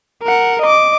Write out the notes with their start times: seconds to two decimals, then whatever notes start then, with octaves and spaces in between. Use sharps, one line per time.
0.24 A#4 F#5
0.62 D#5 D6